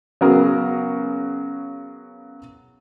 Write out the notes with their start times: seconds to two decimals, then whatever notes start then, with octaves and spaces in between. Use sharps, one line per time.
0.21 C#3 F#3 B3 F#4 G#4 A#4